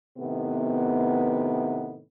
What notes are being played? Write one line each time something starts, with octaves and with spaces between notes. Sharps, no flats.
A2 C3 D#3 B3